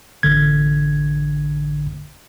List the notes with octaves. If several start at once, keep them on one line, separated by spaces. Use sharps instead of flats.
A1 D3 G#6